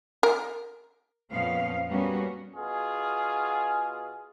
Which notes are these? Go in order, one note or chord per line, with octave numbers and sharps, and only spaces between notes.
A#4
F2 A#2 F3 B3 C#4 F5
G3 A#3 B3 C#4 F#4
B2 F4 G#4